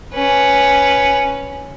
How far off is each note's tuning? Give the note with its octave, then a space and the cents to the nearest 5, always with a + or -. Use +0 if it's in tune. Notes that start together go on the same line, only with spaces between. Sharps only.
C#4 +0 B4 +0